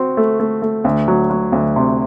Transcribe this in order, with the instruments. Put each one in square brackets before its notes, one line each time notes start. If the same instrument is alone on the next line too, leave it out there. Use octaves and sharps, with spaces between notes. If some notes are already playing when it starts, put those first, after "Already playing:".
Already playing: [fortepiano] C4 F#4
A3
A3
A3
D2
F#3
F#3
D2
C3